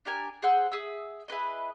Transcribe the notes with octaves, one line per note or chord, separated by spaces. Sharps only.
D4 G4 A#4 G#5
G#4 C5 F#5 E6
G#4 E5 D#6 E6
E4 G#4 B4 D#5